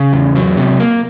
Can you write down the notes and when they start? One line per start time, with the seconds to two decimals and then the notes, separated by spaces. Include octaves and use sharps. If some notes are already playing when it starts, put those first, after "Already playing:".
Already playing: C#3
0.13 E2
0.36 F#3
0.57 C3
0.80 A#3